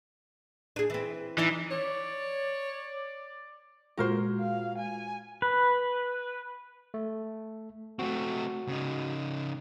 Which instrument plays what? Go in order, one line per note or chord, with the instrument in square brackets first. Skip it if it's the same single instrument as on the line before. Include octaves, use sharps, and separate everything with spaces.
[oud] D4 G#4
E3 C4
[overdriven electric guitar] E3 [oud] D#4 D5
[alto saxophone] C#5 [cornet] D5
[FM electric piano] A#2 G#3 F4 [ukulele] F#4 A#4 C5
[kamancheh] F5
G#5
[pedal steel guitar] B4
[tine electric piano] A3
[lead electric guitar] A3 C4 [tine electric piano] F#4
[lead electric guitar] C#3 D#4